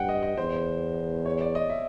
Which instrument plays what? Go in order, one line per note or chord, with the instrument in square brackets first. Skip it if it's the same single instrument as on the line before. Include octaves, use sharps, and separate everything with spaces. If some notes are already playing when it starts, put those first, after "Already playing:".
Already playing: [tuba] G2 [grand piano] F#5 G5
[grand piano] D#5
D#5
[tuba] E2 [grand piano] C5
[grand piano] C#5
D5
D#5
E5